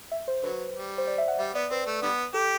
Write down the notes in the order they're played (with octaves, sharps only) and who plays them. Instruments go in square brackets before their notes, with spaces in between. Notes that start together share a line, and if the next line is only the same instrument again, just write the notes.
[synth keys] E5
C5
[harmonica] D3 F#3 [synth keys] B4
[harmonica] G3
[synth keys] C5
D5
E5
F#5
[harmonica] G3 [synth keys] E5
[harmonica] B3 [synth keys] D5
[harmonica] C4 [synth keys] B4
[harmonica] A3
D3 G3 B3
[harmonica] G4 [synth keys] A4